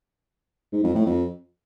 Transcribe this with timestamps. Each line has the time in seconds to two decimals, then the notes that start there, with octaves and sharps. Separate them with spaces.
0.73 G#2
0.84 F2
0.95 A2
1.06 F2